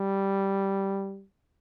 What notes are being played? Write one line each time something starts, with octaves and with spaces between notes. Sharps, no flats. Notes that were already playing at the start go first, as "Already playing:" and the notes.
Already playing: G3